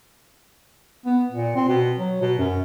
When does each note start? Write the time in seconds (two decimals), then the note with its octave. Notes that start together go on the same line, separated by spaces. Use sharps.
1.06 B3
1.32 A#2
1.55 C4
1.68 B2
1.99 F#3
2.21 B2
2.38 F#2